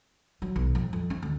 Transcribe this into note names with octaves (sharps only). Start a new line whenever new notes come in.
F#3
B1
F2
F2
C4
D2